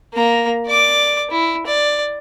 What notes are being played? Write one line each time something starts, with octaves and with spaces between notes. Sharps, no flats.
A#3 A#5
D5 D6
E4
D5